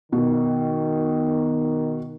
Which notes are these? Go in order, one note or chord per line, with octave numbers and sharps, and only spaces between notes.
B2 D#3